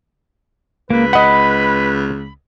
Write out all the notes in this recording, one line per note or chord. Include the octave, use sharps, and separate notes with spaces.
C#2 A#3 B4
D#5 F#5 B5